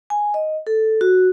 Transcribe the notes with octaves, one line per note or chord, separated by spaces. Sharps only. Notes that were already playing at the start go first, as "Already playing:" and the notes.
G#5
D#5
A4
F#4